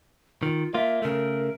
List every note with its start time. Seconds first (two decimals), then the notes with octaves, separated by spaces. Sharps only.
0.43 D#3 F4
0.74 A#3 F4 E5
1.02 C#3 A3 A#4